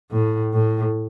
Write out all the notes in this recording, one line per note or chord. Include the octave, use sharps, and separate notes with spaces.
A2
A2